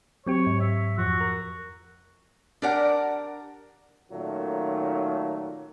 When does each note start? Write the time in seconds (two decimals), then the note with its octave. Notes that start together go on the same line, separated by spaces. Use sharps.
0.27 F#3 C4 G4 C#5
0.47 G#2
0.61 E5
0.98 F2 F3 F#4
1.21 A#4
2.62 D4 G4 A#4 D5 F#5
4.11 A#2 D#3 F#3 A3 C#4